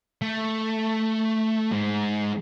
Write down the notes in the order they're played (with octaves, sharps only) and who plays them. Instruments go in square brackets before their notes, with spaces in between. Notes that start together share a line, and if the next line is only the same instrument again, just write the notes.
[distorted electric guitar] A3
G#2